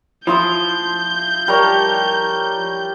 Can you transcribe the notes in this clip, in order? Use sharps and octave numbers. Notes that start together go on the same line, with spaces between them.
F3 E4 B5 C6 D#6 G6
G3 A#4 C#5 A5